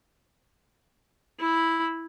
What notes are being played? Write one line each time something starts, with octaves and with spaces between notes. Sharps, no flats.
E4 B5